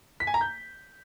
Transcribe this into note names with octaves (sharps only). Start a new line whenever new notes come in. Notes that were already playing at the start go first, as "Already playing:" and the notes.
B6
G#5
A#5
G6